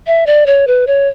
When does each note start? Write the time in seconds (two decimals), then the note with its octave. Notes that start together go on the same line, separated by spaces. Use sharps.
0.07 E5
0.26 D5
0.46 C#5
0.67 B4
0.87 C#5